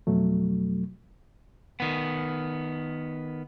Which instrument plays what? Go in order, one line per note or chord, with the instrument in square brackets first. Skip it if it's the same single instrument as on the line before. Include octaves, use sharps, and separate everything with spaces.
[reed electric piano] F2 B2 F#3 A3
[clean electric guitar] D#3 B3